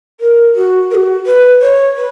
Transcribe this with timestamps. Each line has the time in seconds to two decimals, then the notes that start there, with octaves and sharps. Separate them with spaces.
0.20 A#4
0.55 F#4
0.90 A#4
0.94 F#4
1.26 B4
1.61 C#5
1.96 B4